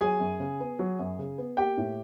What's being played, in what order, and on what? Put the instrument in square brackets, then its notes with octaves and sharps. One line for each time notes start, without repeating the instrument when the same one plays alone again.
[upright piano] F#3 G#4 G#5
F#2
C#3
B3
F#3
F#2
C#3
B3
A#3 G4 G5
A2